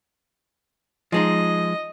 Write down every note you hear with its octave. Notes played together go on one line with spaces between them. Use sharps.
F3 G#3 D#4 D#5